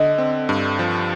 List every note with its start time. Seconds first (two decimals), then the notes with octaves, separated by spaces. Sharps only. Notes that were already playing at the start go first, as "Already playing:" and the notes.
Already playing: D3 D#5
0.18 C4
0.49 G2
0.79 F3